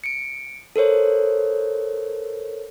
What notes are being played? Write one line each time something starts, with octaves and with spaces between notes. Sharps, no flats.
C#7 D7
A4 A#4 C5 C#5